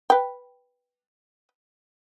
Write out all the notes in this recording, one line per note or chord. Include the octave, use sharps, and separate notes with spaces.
B4 G5